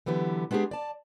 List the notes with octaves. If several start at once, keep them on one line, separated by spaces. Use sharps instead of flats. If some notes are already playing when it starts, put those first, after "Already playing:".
D3 E3 F#3 B3 G4
G#3 B3 D4 G4 G#4
D5 A5